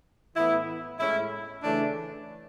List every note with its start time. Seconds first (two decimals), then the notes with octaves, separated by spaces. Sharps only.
0.35 A2 E3 B3 E4
0.98 A2 G#3 C#4 E4
1.62 C#3 E3 A3 C#4 D4